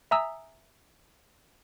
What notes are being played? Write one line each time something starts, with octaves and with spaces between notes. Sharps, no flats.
E5 G#5 A#5 D#6 E6